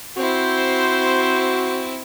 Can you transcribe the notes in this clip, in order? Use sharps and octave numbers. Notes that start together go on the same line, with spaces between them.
C4 E4 F#4 C5